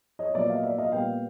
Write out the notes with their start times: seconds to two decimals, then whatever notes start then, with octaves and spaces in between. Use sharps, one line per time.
0.19 C#5 D#5
0.34 A#2 F#3 B3 D5 E5
0.49 D#5 F5
0.63 D5 E5
0.78 D#5 F5
0.92 A#2 G3 B3 F5 G5